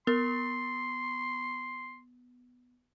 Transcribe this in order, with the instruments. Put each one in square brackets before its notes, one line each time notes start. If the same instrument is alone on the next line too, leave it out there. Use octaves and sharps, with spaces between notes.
[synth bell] B3 [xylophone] A#4 [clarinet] C6